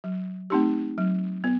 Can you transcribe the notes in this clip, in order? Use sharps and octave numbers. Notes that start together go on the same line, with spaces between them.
F#3
A3 C4 D#4 G4
F#3
B3